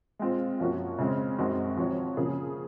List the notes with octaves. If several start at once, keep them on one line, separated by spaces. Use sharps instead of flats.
G#3 C4 F4
F#2 F3 A#3 C#4 F#4
C#3 G#3 C4
F#2 D#3 G#3 C4 F#4
F3 C4 F#4 C#5
C#3 F3 A#3 C#4 G#4